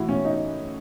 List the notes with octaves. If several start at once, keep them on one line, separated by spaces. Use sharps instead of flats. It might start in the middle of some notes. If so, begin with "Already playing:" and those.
Already playing: A2 E3 E4 F#4
C#4
D#4